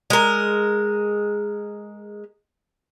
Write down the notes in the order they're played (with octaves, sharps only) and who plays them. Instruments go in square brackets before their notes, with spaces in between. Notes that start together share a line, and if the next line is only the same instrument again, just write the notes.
[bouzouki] G#3 A#4